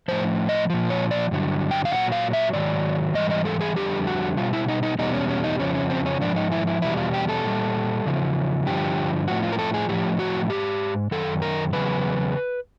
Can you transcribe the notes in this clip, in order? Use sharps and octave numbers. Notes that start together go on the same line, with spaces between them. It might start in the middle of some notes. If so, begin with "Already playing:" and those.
A2 F3 C5
D#5
A#2 F3
C#5
D5
G2 D3 F#3
G5
F5
A#2 F#3 F#5
F5
E5
G#2 D#3 F#3 D5
G#2 E3 G3 D#5
D#5
A4
G#4
F2 D3 G3 G4
F#4
B2 G3 F4
E4
D#4
D#4
E2 B2 G3 D#4
C#4
C#4
D#4
F2 C#3 F3 C#4
C#4
C4
C#4
G#2 F3 D4
D#4
E4
E4
E2 B2 G3 E4
F4
G4
A4
A#2 G3
E2 C#3 F3
G2 D3 F3 G4
A2 F3 F#4
F4
A#4
A4
G#4
A2 F3 G4
F#4
G#2 F3 G4
F#2 D#3 A4
A#4
E2 C#3 F#3 B4